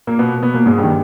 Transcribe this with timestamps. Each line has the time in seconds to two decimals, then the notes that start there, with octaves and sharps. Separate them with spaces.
0.07 A#2 A#3
0.19 B2 B3
0.42 B2 B3
0.54 A#2 A#3
0.66 G#2 G#3
0.78 G2 G3
0.84 D#3